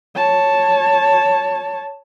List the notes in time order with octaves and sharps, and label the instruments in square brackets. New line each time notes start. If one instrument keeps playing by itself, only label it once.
[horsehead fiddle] C#5 A5